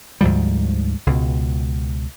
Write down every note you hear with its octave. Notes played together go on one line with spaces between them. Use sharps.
D2 G#2 F3 G3
C#2 B2